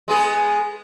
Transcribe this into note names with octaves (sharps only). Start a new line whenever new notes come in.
G#3 B3 G#4